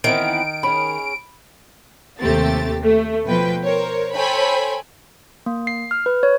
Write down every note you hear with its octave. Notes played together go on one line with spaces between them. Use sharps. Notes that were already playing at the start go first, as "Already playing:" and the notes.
D#3 E3 B3 C4 D7
C#4 G#4 B5
D#2 C3 A3 C4 G4 A6
A3
B2 F3 B4 G5
A#4 C5 C#5
A4 C5 C#5 G5 G#5 B5
A#3
C7
F6
B4
C#5